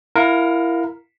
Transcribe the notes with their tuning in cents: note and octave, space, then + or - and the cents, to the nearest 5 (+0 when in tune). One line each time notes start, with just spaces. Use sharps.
E4 +20 A#4 +0 F5 +30